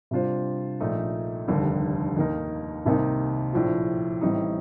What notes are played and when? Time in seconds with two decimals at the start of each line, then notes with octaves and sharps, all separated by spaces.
0.11 C3 G3 D4 F4 C5
0.80 A#1 A#2 A3 D#4
1.48 F1 D#2 D3 G3
2.17 D#2 D#3 A#3 D#4 A#4
2.85 C2 C3 D#3 A#3 D#4
3.53 A#1 A2 F3
4.21 A1 A2 G3 C4 D#4